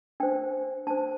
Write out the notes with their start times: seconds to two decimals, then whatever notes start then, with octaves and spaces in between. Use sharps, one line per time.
0.20 D4 C5 G5
0.87 D4 C5 A5